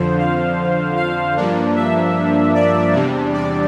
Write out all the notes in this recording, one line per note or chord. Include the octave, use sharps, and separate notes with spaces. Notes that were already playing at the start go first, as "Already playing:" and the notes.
Already playing: F2 D3 F3 C5
F5
F5
G2 F3 A#3 D4
E5
D5
E2 C3 G3 D4
D5